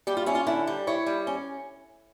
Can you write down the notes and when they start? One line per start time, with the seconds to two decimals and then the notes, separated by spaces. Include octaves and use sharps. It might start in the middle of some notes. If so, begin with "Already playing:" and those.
0.07 G3 G4
0.17 F4
0.26 C#4 E4
0.35 F4
0.47 D3 E4
0.67 G3
0.87 E4 C#5
1.06 G3
1.27 C#4